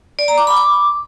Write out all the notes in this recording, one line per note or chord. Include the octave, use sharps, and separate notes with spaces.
D5
A#5
D6
B5
D6